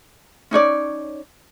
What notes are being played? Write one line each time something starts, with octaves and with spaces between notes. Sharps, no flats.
C#4 D#4 C#5 D5